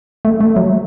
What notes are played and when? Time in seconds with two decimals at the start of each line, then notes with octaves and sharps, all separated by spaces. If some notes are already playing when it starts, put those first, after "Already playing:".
0.25 A3
0.41 A3
0.56 F#3